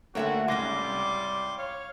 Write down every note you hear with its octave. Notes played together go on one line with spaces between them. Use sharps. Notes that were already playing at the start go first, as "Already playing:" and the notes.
D3 A3 A#3 F#4 C#5 E5 G5
C#2 G#2 G3 C#4 C6 D6 A#6
C2
C#5 F5